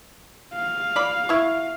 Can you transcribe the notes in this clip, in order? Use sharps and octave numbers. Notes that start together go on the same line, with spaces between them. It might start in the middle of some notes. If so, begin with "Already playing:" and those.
F5
D5 B5
E4 C#6